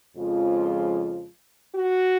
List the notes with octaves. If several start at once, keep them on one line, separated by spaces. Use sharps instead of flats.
F2 C#3 F3 G#3 F4
F#4